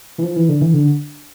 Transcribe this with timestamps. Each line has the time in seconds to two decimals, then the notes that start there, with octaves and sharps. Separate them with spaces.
0.18 E3
0.23 F3
0.36 E3
0.49 D3
0.61 E3
0.74 D3